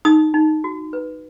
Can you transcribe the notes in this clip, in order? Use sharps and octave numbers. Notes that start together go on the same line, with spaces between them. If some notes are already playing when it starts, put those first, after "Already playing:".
D#4 D#6
D#4
F#4
B4